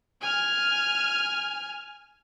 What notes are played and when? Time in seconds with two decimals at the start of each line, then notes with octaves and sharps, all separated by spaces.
0.22 G#5 F6